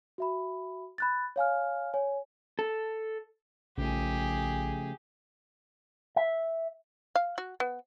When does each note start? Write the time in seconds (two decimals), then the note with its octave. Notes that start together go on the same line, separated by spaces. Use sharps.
0.18 F#4 E5 B5
0.98 B5 F#6 A6
1.36 C#5 F5 G#5 F6
1.94 C#5 G#5
2.59 A4
3.78 A#1 C#3 F3 A3 G4 G#4
6.16 E5
7.15 F5
7.38 F#4
7.60 B3